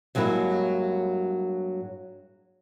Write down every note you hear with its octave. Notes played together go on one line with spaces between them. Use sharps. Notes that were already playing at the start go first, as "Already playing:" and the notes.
G2 F#3 G#3 A#3 E4